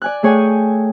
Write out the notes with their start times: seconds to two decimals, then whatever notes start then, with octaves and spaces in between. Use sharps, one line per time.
0.02 D5 G#5 F#6
0.23 A3 G#4 C#5 G5 G#5